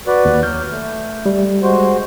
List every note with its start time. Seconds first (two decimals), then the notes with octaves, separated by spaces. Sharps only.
0.07 F#4 B4 D5
0.25 D#2
0.43 F#3 F6 G6
0.70 A3
1.26 G3
1.62 G#3 F#4 C5